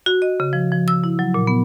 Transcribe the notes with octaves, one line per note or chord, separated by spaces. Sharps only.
F#4
D#5
C#3
F3
F3
E6
E4
F#3
A#2
B3